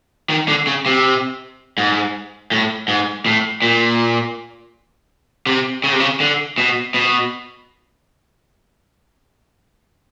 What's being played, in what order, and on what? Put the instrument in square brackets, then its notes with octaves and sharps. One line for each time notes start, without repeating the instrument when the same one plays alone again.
[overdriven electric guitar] D#3
D3
C#3
C3
G#2
A2
G#2
A2
A#2
C3
C#3
C3
C#3
D3
B2
B2